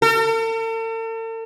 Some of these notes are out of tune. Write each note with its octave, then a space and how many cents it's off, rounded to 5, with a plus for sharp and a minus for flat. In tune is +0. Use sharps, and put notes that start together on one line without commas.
A4 +45